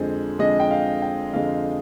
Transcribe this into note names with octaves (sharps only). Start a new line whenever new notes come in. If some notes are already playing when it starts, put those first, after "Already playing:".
Already playing: F2 D3 G#3 C5
F2 D3 G#3 D#5
G5
F5
G5
F2 D3 G#3 F5